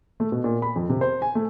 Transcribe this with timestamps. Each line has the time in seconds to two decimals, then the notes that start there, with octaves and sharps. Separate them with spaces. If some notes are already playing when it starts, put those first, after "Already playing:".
0.20 A3
0.32 B2
0.44 A#2
0.62 B5
0.76 F2
0.89 C3
1.01 C5
1.22 G#5
1.35 A3